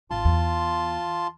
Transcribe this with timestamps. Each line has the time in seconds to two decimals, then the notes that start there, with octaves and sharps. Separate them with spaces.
0.11 G#1 F4 A5 C6
0.25 E2